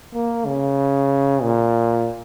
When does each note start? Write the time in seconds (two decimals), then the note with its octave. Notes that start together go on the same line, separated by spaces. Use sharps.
0.14 A#3
0.46 C#3
1.42 A#2